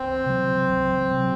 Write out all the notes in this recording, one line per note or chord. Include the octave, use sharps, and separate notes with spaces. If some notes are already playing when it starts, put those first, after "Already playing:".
Already playing: C#2 C4
C3 F#3
C#2
C3 F#3